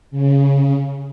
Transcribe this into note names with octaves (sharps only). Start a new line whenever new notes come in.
C#3